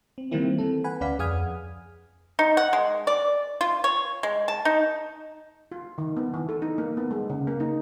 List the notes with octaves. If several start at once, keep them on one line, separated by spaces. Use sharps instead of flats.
C4
D#3 E3 G3 A#3 C4 E4
E3 C4 A4
B4 F#5 G#5 B5
D2 C#4 B4 D5 F5 B6
F2 G#4 F#5 D#6 F6 G#6
D#4
F#5
G#3
D5
F4
C#5
G#3
A5
D#4
F4
D#3
B3
E3
A4
D#4
A#3
B3
G#3
C#3
A#3
D#4